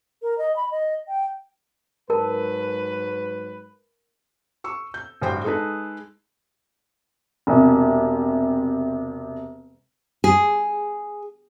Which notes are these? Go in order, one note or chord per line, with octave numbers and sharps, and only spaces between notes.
A#4
D#5
B5
D#5
G5
G#2 F#3 A#4 B4 A5
C#6 E6
G6
A1 G2 F#4 C5 G5
G#3 D#4 G#4 A4 B4
E1 C3
G#4